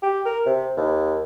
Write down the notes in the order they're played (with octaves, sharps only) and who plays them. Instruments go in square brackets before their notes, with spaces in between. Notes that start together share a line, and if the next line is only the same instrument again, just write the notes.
[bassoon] G4
A#4
C3
D#2